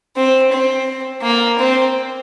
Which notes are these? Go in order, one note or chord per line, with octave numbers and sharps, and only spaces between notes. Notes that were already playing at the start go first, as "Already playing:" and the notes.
C4
C4
A#3
C4